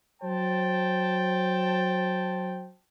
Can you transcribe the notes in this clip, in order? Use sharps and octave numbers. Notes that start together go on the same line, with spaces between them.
F#3 C5 G5 A5